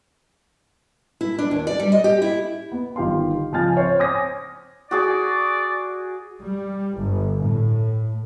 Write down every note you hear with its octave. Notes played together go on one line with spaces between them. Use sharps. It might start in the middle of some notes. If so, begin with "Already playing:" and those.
E4
D4
D#2
D5
G3
D#5
G4
E4
B3
G1 D#3 G4 F5 C6
C#2 F3 C4 G#5 F6 A6
C5 C#5
C#5 G#5 D6 D#6 G#6 A#6
F#4 G#4 D5
G3
G1
A2